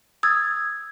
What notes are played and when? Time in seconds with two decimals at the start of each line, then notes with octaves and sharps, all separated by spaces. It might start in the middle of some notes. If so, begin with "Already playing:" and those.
0.23 D#6 E6 G#6 A6